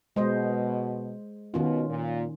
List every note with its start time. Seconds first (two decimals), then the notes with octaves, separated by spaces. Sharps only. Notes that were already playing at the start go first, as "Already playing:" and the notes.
0.16 B2 G#3 C5 D#5
1.54 B2 D#3 C#4 F4
1.88 A#2